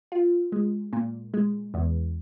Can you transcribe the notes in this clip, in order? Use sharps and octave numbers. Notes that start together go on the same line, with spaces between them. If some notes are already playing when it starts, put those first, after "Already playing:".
F4
G#3
A#2
G#3
E2